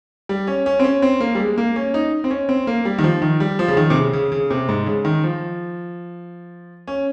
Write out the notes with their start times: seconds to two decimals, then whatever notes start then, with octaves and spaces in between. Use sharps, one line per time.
0.29 G3
0.47 C#4
0.66 C#4
0.79 C4
0.84 C#4
1.02 C4
1.20 A#3
1.35 G3
1.39 G#3
1.58 A#3
1.76 C#4
1.94 D#4
2.24 C4
2.31 C#4
2.49 C4
2.67 A#3
2.85 G3
2.98 D#3
3.04 F3
3.22 D#3
3.40 G3
3.59 F3
3.68 C#3
3.77 D#3
3.90 C3
3.96 C#3
4.13 C#3
4.32 C#3
4.50 C3
4.69 G#2
4.86 C#3
5.05 D#3
5.23 F3
6.88 C#4